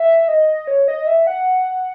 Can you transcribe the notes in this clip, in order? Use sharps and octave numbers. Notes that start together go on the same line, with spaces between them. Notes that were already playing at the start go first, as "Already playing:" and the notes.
Already playing: E5
D#5
C#5
D#5
E5
F#5